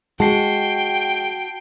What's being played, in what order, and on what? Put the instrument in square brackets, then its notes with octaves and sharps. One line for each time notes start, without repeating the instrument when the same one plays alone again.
[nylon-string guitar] G#3 [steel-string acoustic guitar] F#4 [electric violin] G5 [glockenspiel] A5 C7